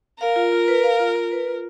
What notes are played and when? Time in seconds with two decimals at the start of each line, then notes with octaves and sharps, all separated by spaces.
0.20 A#4 F5
0.36 F4
0.52 F4
0.68 B4
0.84 F5
1.00 F4
1.16 F4
1.32 B4
1.48 F4